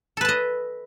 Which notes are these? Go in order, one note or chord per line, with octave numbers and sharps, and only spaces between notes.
A4 B4 D#5 A5